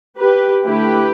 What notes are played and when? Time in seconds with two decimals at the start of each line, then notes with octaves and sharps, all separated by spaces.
0.19 G4 B4
0.65 D3 A3 E4 G4 B4